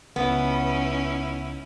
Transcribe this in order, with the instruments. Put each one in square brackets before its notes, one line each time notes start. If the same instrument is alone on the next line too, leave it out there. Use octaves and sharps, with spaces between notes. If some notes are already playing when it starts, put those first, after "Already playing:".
[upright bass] C#2 [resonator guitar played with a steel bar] B3 [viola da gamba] C#4 D#4 E4